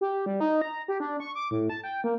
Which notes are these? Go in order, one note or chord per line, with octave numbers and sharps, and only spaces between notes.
G4
G3
D#4
A#5
G4
D4
C#6
D6
A2
A5
G5
A#3